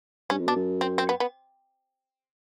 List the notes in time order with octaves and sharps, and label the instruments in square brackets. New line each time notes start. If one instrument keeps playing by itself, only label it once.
[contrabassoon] G2 [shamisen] C#4
[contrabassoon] F2
[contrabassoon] B2 [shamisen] D4
[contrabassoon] F#2
[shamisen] C4
C4
B3
B3